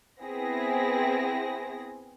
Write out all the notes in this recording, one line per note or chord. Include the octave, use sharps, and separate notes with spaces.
B3 C4 E4 G#4 A#6